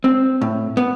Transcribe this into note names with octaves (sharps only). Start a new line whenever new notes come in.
C4
A2
B3